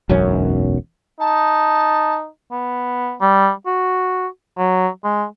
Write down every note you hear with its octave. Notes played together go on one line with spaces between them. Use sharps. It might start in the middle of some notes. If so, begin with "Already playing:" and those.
E1 B1 F#2 C#4
D#4 A5
B3
G3
F#4
F#3
G#3